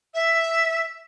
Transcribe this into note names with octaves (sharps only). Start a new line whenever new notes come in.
E5